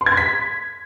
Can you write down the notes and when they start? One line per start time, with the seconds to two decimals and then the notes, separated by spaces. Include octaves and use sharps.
0.01 C6
0.06 G#6
0.12 C6
0.17 B6